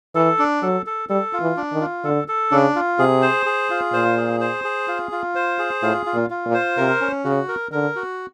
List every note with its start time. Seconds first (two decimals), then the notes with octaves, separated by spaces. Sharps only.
0.15 E3 A4
0.39 D4
0.62 F#3 A4
0.86 A4
1.09 G3 A4
1.33 F4
1.41 E3
1.57 D4
1.72 D#3
1.81 F4
2.04 D3 A4
2.28 A4
2.51 C#3 D4
2.76 F4
2.99 C3 G#4
3.22 C5
3.46 G#4
3.70 F4
3.93 A#2 C5
4.17 G#4
4.40 C5
4.64 G#4
4.88 F4
5.12 F4
5.35 C5
5.59 G#4
5.83 A2 F4
6.06 F4
6.14 A#2
6.30 F4
6.46 A#2
6.54 C5
6.77 C3 A#4
7.01 C#4
7.24 C#3 F#4
7.48 A#4
7.72 D3 A#4
7.95 F#4